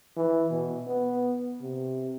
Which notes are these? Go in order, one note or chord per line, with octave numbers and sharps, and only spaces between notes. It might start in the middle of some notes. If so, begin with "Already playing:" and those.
E3
B2
B3
C3